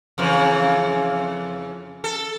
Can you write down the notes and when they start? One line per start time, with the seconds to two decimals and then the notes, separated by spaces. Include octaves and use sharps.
0.18 F2 C#3 E3
2.04 A4